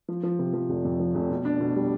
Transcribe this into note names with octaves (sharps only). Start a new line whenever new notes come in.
F3
F3
C3
F3
F1
F2
F3
F1
B2
D4
B2
G3